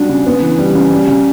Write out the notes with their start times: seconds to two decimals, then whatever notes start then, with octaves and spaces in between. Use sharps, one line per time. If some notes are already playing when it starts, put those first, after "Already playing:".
Already playing: G3 D4 F#4
0.09 C#3
0.26 B3
0.42 E3
0.59 G3
0.75 C#3
0.92 G3
1.07 C#3